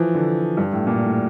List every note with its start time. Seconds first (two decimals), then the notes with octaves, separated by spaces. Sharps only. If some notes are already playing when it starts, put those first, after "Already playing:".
Already playing: E3 F3
0.15 D3
0.57 G2
0.72 A2
0.87 A#2
1.01 A2